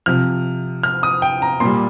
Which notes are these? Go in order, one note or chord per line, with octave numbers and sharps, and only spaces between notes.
C3 F3 F6
F6
D#6
G5
A#5
A#2 G3 C6